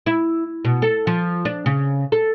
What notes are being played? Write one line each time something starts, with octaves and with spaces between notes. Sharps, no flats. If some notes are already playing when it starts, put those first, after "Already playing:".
E4
B2
A4
F3
D4
C#3
A4